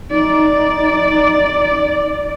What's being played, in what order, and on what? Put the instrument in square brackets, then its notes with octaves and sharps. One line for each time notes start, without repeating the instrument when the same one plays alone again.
[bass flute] D#4 [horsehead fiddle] D5